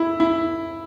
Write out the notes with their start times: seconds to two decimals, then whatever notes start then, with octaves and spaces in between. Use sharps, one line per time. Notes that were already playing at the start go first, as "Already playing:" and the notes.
Already playing: E4
0.20 E4